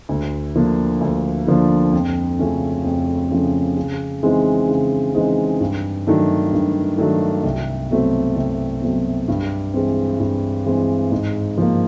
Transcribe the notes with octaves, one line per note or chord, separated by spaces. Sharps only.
D2
D3 F3 A#3 D4
D2
D3 F3 A#3 D4
F2
C#3 F3 A3 C#4
F2
C#3 F3 A3 C#4
C#3
E3 G#3 C4 D#4
C#3
E3 G#3 C4 D#4
G2
D#3 F#3 A3 D4
G2
D#3 F#3 A3 D4
C2
B2 F#3 A3 C4
C2
B2 F#3 A3 C4
G2
E3 G#3 C4
G2
E3 G#3 C4
G#2
F3 A#3